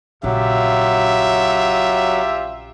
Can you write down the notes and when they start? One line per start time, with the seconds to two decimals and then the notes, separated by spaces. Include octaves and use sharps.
0.23 A#1 C#3 F#3 F4 G4 E5